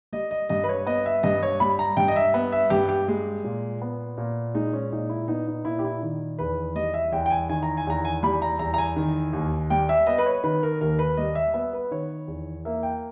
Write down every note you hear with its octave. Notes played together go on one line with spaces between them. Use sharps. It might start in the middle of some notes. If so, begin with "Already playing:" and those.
G3 D#5
D#5
G2 D#5
B4
C#5
B3 D#5
E5
G2 D#5
C#5
G3 B5
A#5
G2 G5
D#5
E5
B3
E5
G2 G4
G4
G#3
A#2
B3
A#2
G#3 D#4
C#4
A#2 D#4
E4
B3 D#4
D#4
A#2 E4
G4
E4
D#3
E2 B4
G3 D#5
E5
E2 G5
G5
G#5
D#3 G#5
A#5
G#5
E2 A#5
G#5
G3 B5
A#5
E2 A#5
A#5
G#5
D#3
D#2
G3 G5
E5
B3 D#5
B4
C#5
D#3 B4
A#4
D#2 A#4
B4
G3 D#5
E5
B3 E5
B4
D#3 C#5
E2
A#3 E5
G5